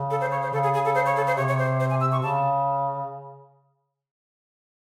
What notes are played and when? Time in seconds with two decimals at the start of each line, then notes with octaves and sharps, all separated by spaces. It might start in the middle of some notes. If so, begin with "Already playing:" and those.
Already playing: C#3
0.11 A4
0.21 C5
0.31 C#5
0.42 C5
0.53 C#3 A4
0.63 G#4
0.74 G#4
0.85 A4
0.95 C5
1.06 C#5
1.16 A4
1.27 C5
1.37 C3 C#5
1.48 C#5
1.59 C5
1.80 C5
1.90 G#5
2.01 E6
2.12 C#6
2.22 C#3 A5